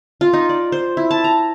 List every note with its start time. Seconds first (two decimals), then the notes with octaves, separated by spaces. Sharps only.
0.21 F4
0.33 D#4
0.49 D5
0.72 C5
0.97 E4
1.11 A5
1.24 A#5